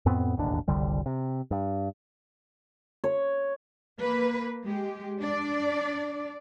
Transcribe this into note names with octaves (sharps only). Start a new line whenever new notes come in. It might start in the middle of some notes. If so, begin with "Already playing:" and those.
F2 A2 B3 C4
E1 A1 D#2 D4
F#1 C2 D3 G3
C3
G2
C#5
A#3 B4
G#3 G4
D4 D5